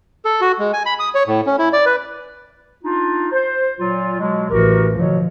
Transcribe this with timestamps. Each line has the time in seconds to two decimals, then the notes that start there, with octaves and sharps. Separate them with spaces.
0.25 A4
0.41 F#4
0.59 G#3
0.73 G#5
0.86 B5
1.00 D#6
1.15 C#5
1.28 A2
1.46 C#4
1.59 E4
1.73 D5
1.86 B4
2.84 D4 D#4 F4
3.32 C5
3.79 A#2 F#3 F4
4.19 B2 F#3 G#3
4.50 A1 E3 F#4 G4 A#4
4.95 B2 D3 F3 F#3